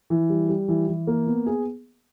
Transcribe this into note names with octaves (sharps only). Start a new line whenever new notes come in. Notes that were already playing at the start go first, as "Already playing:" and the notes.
E3
G3
G3
E3
E3
A#3
B3
G#4